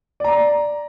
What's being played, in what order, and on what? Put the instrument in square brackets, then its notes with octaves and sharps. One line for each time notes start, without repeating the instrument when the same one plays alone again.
[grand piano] D5 A#5